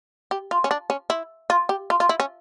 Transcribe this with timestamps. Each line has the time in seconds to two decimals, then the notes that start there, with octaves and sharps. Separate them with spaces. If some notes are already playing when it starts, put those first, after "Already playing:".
0.31 G4
0.51 F4
0.64 C#4
0.71 D4
0.90 C#4
1.10 E4
1.50 F4
1.69 G4
1.90 F4
2.00 F4
2.09 E4
2.20 C#4